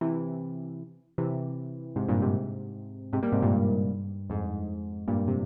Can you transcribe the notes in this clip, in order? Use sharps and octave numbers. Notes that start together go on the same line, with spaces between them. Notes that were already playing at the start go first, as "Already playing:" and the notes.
C3 E3
C3 E3
G#2 C3
G2 A#2
G#2 C3
G#2 C3
G3 A#3
G#2 C3
G2 A#2
G2
F2 G#2
G2 A#2
C3